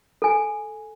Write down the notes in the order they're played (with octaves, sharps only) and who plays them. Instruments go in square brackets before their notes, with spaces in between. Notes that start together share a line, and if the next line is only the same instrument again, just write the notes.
[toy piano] A4 G#5